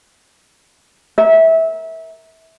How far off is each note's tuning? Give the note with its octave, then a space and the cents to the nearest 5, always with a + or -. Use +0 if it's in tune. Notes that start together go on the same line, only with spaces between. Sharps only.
A#4 +0 E5 -20